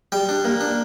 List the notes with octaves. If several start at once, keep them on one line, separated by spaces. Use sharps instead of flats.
G3 G5
D4
A#3
D4